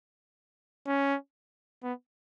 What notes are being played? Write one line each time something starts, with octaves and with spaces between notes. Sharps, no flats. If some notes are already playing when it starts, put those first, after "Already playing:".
C#4
B3